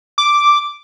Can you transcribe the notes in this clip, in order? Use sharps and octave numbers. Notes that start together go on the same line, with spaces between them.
D6